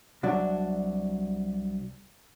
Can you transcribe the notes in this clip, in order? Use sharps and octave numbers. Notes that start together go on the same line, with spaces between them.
C2 F#3 D4